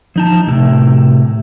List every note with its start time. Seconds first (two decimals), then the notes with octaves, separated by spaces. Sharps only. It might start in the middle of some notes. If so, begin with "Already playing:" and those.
0.16 F3 D#4 A5
0.47 A2 C3